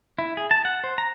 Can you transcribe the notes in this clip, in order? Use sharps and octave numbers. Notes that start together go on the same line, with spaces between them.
E4
G#4
A5
F#5
C5
A#5